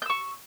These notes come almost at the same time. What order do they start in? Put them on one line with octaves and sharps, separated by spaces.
G6 E6 C#6